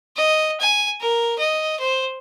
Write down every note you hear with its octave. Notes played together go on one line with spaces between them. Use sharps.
D#5
G#5
A#4
D#5
C5